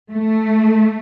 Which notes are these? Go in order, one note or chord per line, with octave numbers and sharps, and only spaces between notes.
A3